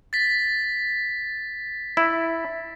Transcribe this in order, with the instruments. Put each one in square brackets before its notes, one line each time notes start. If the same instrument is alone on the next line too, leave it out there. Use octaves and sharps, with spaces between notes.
[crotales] A6 B6
[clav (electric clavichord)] E4